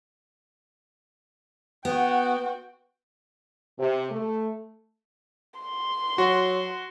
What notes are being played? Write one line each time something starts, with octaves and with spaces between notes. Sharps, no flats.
B3 F#4 G5
C3
A3
C6
F#3 F#4